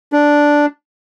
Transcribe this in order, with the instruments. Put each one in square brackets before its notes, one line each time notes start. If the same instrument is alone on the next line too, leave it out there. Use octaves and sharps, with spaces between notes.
[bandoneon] D4